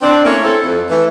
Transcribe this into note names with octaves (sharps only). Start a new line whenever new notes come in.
C4 D4
A3 A#3 C#4 E4 A#4 C#5
C4 E4 A4
F2
E3 A3